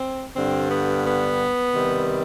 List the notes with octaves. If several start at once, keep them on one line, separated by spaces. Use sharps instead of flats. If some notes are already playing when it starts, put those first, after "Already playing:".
Already playing: C4
G2 D3 G3 C4
B3
B3
C3 D#3 G3